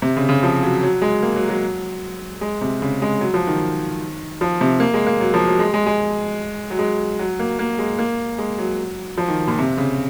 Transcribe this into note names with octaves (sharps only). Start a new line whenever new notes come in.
C3
C#3
C#3
F3
F#3
F#3
G#3
A#3
F#3
F#3
G#3
C3
C#3
G#3
F#3
F3
D#3
F3
C3
A#3
G#3
A#3
F#3
F3
F#3
G#3
G#3
G#3
F#3
G#3
F#3
A#3
A#3
G#3
A#3
G#3
F#3
F3
D#3
A#2
C3
C#3